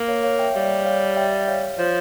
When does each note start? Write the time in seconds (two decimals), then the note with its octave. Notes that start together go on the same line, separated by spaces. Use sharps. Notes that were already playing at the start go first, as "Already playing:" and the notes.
Already playing: A#3
0.08 C#5 F5
0.23 C#5 F5
0.39 E5 G5
0.55 G3 C#5 F5
0.85 C#5 F5
1.16 E5 G5
1.48 C#5 F5
1.78 F3 C#5 F5